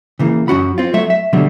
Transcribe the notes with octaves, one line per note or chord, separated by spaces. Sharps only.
C#3 E3 A#3
F#2 C#4 F#4 B5
C4 F4
F#3 A3 E5
E5
B2 D3 F#3 G3